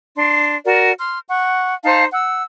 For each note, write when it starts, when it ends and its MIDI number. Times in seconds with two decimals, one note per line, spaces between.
0.16 0.55 62
0.16 0.55 84
0.65 0.92 66
0.65 0.92 70
0.65 0.92 74
0.98 1.18 84
0.98 1.18 89
1.28 1.74 78
1.28 1.74 85
1.84 2.05 63
1.84 2.05 72
1.84 2.05 77
1.84 2.05 81
2.12 2.42 78
2.12 2.42 88